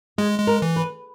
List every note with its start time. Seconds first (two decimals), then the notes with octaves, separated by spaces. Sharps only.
0.18 G#3 G#4
0.39 G#3
0.47 A#4
0.62 E3
0.76 B4